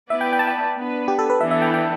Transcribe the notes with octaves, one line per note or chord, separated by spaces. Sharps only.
B3 E4 B4 D5 E5
G5
G5
A5
G5
B3 D4 B4
G4
A4
B4
E3 B3 D4 A4 E5
E5
G5
G5